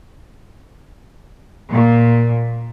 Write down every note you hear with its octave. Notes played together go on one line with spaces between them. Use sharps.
A#2